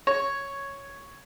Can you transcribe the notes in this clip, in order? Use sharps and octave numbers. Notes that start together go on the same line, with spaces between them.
C#5